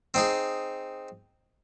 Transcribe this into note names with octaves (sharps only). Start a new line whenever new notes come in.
C4 D#4 G#4